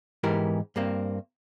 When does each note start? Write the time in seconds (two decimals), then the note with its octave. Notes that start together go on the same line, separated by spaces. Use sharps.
0.24 G#2 E3 B3 G4 A#4
0.76 G2 A#3 C4